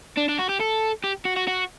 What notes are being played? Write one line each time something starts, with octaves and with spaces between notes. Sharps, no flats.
D4
D4
F#4
G4
A4
G4
F#4
F#4
F#4